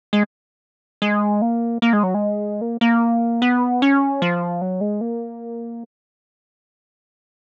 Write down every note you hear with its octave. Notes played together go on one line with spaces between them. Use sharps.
G#3
G#3
A#3
A#3
G#3
F#3
G#3
A#3
A#3
B3
C#4
F3
F#3
G#3
A#3